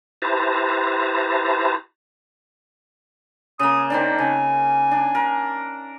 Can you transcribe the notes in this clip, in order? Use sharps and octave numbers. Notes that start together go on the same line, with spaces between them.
E4 G4 B4 C5 A5 A#5
C#3 A#3 D#6
D#3 C4 D4 D5
C#3 G#5
D4
A#4